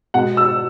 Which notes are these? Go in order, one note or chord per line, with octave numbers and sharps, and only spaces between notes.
B2 G#3 F#5
E6